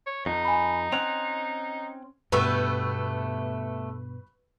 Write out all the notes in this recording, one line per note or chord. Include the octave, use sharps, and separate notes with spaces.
C#5
F2 D#4
G#5 B5
C4 C#4 F#5 F7
G2 B2 A3 B3 G4 B4 C#6 E6